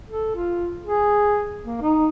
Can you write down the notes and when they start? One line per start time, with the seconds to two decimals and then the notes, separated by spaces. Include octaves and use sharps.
0.08 A4
0.36 F4
0.86 G#4
1.64 A#3
1.81 D#4